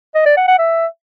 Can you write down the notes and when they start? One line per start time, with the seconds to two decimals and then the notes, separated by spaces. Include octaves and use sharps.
0.15 D#5
0.26 D5
0.37 F#5
0.48 F#5
0.59 E5